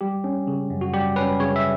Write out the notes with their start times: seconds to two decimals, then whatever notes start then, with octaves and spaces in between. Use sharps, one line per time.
0.01 G3 G4
0.24 C#4
0.47 C#3
0.70 F#2
0.81 F#4
0.93 G3 G4
1.16 C#4 B4
1.40 C#3 C#5
1.56 E5